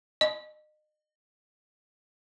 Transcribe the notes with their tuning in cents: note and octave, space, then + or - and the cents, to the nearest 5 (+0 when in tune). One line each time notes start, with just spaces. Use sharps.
D#5 -35